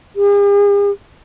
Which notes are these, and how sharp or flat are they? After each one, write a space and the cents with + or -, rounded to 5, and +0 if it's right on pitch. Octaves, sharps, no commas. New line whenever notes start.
G#4 -45